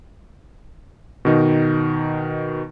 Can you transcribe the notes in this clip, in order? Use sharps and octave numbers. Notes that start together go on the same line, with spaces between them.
B2 D#3 D#4